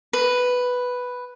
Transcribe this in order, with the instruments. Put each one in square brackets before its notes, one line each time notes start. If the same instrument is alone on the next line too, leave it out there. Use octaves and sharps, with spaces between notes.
[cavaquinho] B4